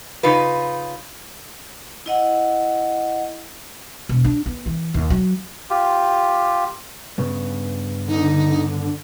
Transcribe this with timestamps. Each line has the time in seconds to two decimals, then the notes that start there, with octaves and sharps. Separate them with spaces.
0.23 C#3 D#4 F4 B4
2.06 E4 D#5 F#5
4.09 E1
4.25 D4
4.46 B3
4.66 E3
4.94 D#2
5.10 F#3
5.70 F4 G4
7.18 G2 C#3 B3
8.08 D3 D#4